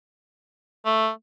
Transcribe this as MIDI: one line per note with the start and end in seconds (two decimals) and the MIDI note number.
0.85 1.09 57